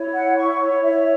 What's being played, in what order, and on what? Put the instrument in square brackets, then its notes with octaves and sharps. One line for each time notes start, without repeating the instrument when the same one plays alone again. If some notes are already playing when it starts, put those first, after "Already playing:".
Already playing: [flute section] E4 C#5
F#5
C#6
C#5
E4 C#5 E5